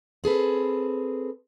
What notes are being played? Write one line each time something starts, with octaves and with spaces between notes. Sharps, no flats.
C4 G#4 A4 B4